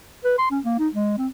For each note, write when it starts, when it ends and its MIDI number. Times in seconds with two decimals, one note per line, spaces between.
0.25 0.36 71
0.39 0.49 84
0.51 0.60 61
0.65 0.76 58
0.79 0.88 63
0.95 1.15 56
1.18 1.28 60